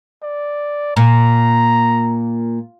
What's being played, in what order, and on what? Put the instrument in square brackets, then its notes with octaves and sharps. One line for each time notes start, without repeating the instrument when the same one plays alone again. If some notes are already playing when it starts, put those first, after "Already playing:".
[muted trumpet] D5
[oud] A#2 [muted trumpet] A#5